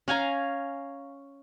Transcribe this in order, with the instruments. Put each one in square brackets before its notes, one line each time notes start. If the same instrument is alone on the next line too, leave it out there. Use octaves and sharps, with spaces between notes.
[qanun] C#4 F5 G#5 A#5